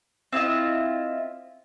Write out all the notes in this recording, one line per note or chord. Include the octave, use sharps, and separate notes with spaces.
C4 E4 F4 D#5